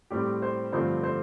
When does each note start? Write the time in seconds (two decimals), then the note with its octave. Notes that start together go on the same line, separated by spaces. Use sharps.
0.10 A2 G3 C4 G4
0.42 C5
0.73 G2 D3 F3 A3 C4 C5
1.03 C5